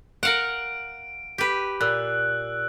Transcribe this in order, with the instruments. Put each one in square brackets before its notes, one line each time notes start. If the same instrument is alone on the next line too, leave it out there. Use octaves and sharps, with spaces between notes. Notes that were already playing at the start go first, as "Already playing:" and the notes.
[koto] A#4 F5 F#5 [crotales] D7
[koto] G4 B4
[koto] A#2 [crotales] E6 F#6